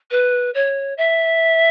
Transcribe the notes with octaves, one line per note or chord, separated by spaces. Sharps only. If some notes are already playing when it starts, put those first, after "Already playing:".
B4
C#5
E5